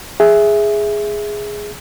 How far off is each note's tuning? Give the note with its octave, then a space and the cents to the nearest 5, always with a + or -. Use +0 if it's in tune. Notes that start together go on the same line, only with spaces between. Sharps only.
G#4 +0 E5 +0